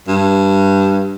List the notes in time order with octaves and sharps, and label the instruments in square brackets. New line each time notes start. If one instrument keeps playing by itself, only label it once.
[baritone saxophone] G2